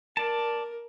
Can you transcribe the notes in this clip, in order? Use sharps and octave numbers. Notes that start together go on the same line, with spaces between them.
A#4 D5 A5